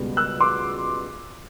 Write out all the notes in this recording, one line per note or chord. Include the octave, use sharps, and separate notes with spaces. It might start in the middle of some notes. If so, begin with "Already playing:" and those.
Already playing: C#2 B2 G3 B3
E6 F#6
C6 D6